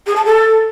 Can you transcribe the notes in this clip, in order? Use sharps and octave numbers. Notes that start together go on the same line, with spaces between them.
G#4
A5
A4